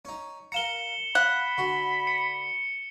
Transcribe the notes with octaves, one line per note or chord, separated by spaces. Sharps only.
C#4 D#4
A#4 F5 A#5 C#7 E7 G7
F5 F#5 B5
D3 F#4
C#7